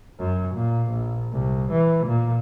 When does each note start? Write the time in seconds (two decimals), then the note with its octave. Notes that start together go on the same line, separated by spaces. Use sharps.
0.19 F#2
0.54 A#2
0.91 A#1
1.32 C2
1.72 E3
2.06 A#2